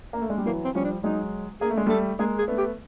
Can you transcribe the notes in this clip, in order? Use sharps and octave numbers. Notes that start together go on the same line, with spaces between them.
A#3
A3
G#3
G3
E3 F#3 A#3
C4
F3 G3 C#4
D4
F#3 G#3 D#4
A#3 G#4
A3
G#3
G3 A3 A4
G#3 A#3 G#4
G#4
A3 B3
G4